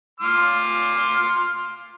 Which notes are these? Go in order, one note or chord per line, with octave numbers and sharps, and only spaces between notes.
C6 D6 F6